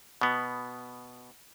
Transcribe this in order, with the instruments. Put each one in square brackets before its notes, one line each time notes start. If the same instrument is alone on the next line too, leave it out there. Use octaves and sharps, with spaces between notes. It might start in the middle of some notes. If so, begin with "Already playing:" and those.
[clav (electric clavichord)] B2 B3